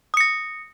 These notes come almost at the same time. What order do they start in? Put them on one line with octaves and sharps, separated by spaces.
D#6 C#7 A#6